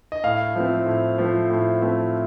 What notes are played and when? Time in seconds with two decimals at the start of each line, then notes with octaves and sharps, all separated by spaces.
0.12 D#5
0.24 A2 F5
0.55 F3 A3 C4
0.86 A2
1.18 F3 A3 C4
1.50 A2
1.81 F3 A3 C4